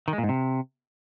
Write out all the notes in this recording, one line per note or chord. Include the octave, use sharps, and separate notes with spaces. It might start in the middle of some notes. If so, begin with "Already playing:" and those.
D#3
G#3
A#2
G#2
C3